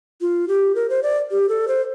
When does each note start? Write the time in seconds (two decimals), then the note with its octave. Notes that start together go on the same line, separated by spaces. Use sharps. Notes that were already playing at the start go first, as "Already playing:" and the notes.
0.21 F4
0.48 G4
0.75 A#4
0.90 C5
1.03 D5
1.31 G4
1.49 A4
1.68 C5